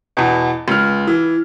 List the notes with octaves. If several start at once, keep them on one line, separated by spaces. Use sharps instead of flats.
E2 B2
C#2 F6
E3